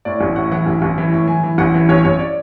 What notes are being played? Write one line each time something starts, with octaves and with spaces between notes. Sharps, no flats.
A2 D5
A1
A2 F#5
E3 F#5
A1
A1
E3
A2
E3 G#5
E3
A1 F#5
E3
A1 C#5
A1 C#5
D5